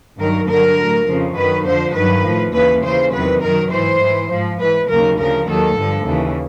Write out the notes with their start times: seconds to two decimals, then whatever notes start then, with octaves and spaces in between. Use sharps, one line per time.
0.19 G2 D#3 F#3 A#4
0.48 G2 D3 F#3 A#4
0.78 A2 F#3
1.07 F2 C#3 F3
1.36 F#2 D#3 F#3 B4
1.66 F2 D3 F3 C5
1.94 G2 D#3 F#3 B4
2.24 A2 F3
2.53 D#2 C#3 E3 B4
2.83 D#2 C#3 E3 C5
3.12 E2 C3 D#3 F#3 B4
3.42 F#2 D#3 F#3 A#4
3.71 G#2 E3 C5
4.00 G#2 E3
4.29 G#2 F3
4.59 G#2 E3 B4
4.89 D#2 C#3 F#3 A#4
5.18 D2 C#3 F3 A#4
5.47 D#2 D#3 F#3 A4
5.77 G2 D3 F3
6.06 D#2 C#3 E3